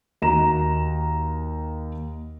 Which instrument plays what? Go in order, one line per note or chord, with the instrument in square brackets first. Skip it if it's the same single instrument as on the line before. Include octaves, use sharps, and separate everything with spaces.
[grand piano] D#2 F#4 A#5 E7